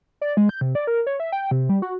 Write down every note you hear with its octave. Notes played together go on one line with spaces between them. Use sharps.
D5
G#3
G6
C3
D5
A#4
C#5
E5
G5
C3
G3
F#4